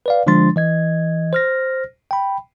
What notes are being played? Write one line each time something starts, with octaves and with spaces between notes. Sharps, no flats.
B4 D5 F5
D3 F3 G#3 D4 C6 A6
E3 D#5 G#6
C5 F6 A#6
G5 B5